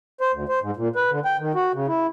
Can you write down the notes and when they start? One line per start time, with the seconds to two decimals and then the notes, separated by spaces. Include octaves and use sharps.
0.21 C5
0.33 D2
0.49 C5
0.62 G#2
0.77 A#2
0.96 B4
1.11 D3
1.25 G5
1.40 D#3
1.55 F#4
1.74 C#3
1.87 E4